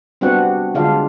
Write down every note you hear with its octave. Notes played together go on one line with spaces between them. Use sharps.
G3 B3 C4 D4 F#4 F#5
D3 G#3 D4 F4 F5